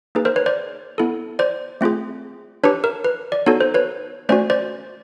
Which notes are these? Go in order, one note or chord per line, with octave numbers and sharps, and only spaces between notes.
A#3 D#4 G#4 B4
A#4 C5
B4 C#5
C5 D5
B3 E4 A4
C5 D5
A3 C4 F4 G#4
D4 G4 B4 C#5
A#4
B4
D5
B3 D#4 F#4 A4 C#5
C5
B4 C#5
A3 C#4 F#4 C5 D5
C5 D5